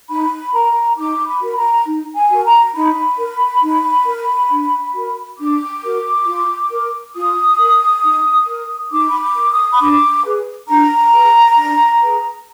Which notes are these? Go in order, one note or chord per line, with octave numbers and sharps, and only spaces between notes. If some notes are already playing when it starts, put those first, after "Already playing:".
D#4 B5
A#4 A#5
D#4 D6
B5
F#4 A#4
A#5
D#4
G#5
F#4 A#4
A#5
D#4 B5
A#4
D#4
A#4
D4
F#4 A#4
D4 D6
F#4 A#4
F4
A#4
F4 D#6
A#4
D#4
A#4
D#4 D6
B5
D6
A#4
D#6
B5
D4 D6
G#4 B4
D4 A#5
G#4 B4
D4
G#4 B4